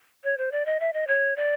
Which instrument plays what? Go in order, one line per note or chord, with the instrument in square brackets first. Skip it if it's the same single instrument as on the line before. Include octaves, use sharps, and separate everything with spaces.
[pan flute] C#5
C5
D5
D#5
E5
D#5
C#5
D5